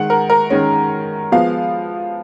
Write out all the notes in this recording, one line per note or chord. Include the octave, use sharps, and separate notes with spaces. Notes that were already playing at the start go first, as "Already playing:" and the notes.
Already playing: D#3 G#3 F#5
A#4
A#4
D#3 G#3 C#4
F3 G#3 B3 F5